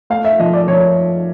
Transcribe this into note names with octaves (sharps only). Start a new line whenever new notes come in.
A3 F5
E5
F3 D#5
D5
F3 C#5